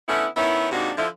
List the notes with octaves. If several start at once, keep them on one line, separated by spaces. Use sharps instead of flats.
D3 A3 B3 C#4 E4
D#3 B3 C#4 E4
G#2 C3 A#3 D4 D#4 F#4
D3 F3 E4